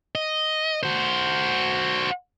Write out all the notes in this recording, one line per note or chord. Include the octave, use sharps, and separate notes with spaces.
D#5
F#4 C5